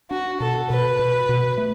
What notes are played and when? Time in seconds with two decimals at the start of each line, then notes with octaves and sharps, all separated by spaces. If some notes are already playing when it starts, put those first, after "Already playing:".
0.10 D4 F#4
0.40 B2 A4
0.70 B2 B4
0.99 B2
1.29 B2
1.58 A3